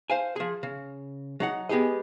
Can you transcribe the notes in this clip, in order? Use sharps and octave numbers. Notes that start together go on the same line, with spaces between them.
C5 F5 G#5
F3 G#4
C#3
F#3 D#4 F#5
G#3 B3 G4 G#4 D#5